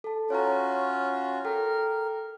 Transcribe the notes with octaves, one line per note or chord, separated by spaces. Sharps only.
A4 A5
C#4 F4 F#4 C#5 A#5
A4 A#4 G5